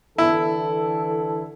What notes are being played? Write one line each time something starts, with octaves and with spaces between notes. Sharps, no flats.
D3 E3 E4 A4